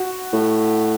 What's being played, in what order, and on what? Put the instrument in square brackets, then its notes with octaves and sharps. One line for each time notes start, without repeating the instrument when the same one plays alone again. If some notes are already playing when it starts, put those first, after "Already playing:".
Already playing: [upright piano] F#4
[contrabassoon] A2